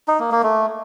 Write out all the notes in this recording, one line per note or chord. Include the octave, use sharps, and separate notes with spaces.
D#4
A#3
A#3
A3